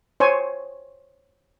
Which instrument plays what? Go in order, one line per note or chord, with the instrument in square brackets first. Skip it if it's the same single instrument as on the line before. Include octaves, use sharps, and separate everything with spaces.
[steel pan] C5 C#5 G#5